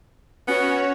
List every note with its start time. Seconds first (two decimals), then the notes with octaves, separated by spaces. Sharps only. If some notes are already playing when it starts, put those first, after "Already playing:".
0.48 B3 C#4 F#4 C#5